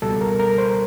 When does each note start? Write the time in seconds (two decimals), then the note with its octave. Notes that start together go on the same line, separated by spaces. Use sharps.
0.02 C#2 B2 G3 A4
0.21 A#4
0.39 A#4
0.58 C5